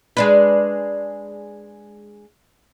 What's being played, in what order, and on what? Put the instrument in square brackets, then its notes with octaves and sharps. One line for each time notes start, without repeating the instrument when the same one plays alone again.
[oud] G#3 D4 B4